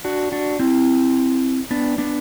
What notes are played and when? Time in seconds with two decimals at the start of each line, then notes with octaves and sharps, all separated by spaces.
0.04 D4 F#4
0.32 D4 F#4
0.60 C4 E4
1.71 B3 D4
1.98 B3 D4